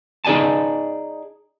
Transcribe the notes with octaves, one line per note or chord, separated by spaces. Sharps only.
D#4 G#4 D5 G#5 A5